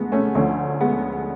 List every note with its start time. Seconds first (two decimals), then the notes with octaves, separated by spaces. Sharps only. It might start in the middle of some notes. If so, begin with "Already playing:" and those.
Already playing: D2 C#3 F3 G#3 A3 B3
0.12 A3 C#4
0.35 D2 D3 F3 A3 C#4
0.81 G#3 B3